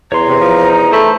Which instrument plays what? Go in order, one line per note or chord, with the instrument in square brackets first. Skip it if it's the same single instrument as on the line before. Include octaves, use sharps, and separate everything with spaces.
[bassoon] E2 [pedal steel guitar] C#5 C6 [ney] A#5
[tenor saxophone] C3
F3
[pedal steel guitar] D#4
[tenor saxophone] A3 [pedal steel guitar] C5 A5 B5